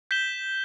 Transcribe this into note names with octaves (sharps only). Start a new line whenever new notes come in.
G6 B6 E7 G7